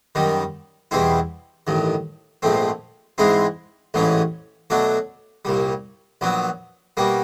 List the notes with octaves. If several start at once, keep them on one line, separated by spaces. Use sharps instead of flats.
F#2 D#3 G3
E2 B2 G3 C4 E4
A1 G2 D#3
A#1 G#2 F3 A3 C4
G#2 E3 G#3 C4 E4
A1 G#2 E3 A3 C#4
B2 F#3 A3 D4
C2 A#2 G3
A#1 A#2 F#3 B3
B2 G3 A#3